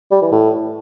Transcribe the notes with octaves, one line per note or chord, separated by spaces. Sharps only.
G3
E3
A2